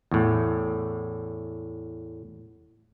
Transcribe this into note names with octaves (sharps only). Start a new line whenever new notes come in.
E2 A2